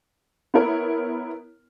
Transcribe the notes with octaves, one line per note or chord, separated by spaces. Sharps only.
B3 E4 A#4 C#5